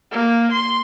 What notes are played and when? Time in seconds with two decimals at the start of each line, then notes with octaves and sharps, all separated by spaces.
0.11 A#3
0.52 C6